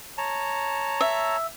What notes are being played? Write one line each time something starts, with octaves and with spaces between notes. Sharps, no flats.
C#5 A5 A#5
E5